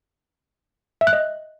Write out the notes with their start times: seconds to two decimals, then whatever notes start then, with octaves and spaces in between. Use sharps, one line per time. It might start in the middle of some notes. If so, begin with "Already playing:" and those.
1.01 E5
1.07 F#6
1.13 D#5